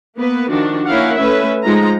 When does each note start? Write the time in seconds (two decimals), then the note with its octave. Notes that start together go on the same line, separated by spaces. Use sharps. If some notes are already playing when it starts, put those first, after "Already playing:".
0.18 A#3 B3 B4
0.50 D#3 F3 D4 F#4
0.87 A#3 C#4 E4 A#4 F5 F#5
1.16 A3 C#4 B4 E5
1.63 F3 G#3 D#4 F4 A#5